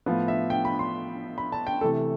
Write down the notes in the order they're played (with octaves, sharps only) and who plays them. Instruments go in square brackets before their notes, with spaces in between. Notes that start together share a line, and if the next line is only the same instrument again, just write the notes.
[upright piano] A2 F3 B3
E5
G5
B5
C6
B5
A5
G5
C3 E3 A3 A4